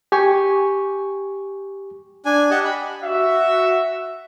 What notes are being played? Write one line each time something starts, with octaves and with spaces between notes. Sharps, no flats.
G4 G#5 C#6
D4 G#5
G4 D#5 F#5 A5
B5
F#4 E5